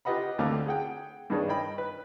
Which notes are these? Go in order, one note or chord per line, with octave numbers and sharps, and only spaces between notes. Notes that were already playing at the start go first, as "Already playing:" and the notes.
F4 G4 B4 D#5 F#5 B5
D2 D3 A3 C4 F5 D6
G#4 F#5 G5
G2 D#3 D4 G#4 C#5
D#5 G5 B5
B4